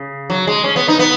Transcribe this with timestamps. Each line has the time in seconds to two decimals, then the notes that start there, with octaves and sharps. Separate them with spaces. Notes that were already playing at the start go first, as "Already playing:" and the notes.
Already playing: C#3
0.30 F#3
0.47 G#3
0.64 C#4
0.76 B3
0.88 D#4
0.99 B3